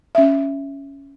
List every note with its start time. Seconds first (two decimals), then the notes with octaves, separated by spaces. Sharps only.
0.15 C#4 E5